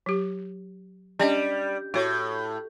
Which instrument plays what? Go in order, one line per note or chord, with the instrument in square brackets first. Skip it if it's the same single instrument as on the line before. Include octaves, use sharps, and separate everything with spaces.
[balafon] F#3 G4
[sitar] G3 [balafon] C#4 D4 D#5
[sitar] A2 [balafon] F#4 C#5